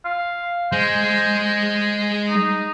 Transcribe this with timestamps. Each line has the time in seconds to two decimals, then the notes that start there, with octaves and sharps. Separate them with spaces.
0.06 F5
0.72 G#3 C5
2.29 D#4